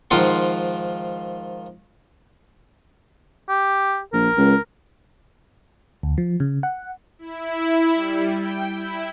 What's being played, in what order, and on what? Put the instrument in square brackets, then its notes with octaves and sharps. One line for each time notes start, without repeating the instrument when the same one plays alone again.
[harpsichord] G#2 D#3 F3 F4 F#5 C6
[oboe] G4
[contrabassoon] A#1 [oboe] A#4
[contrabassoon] C#2
[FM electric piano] D2
F3
C#3
F#5
[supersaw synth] E4
G3
G5
E4